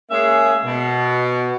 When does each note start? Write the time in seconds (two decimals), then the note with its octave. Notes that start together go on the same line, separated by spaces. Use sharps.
0.11 G#3 A#3 C#4 G#4 E5
0.65 B2